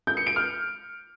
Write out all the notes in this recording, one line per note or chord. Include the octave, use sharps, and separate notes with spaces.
G6
C#7
D7
F6